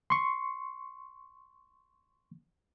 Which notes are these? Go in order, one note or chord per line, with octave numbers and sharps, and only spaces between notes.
C6 C#6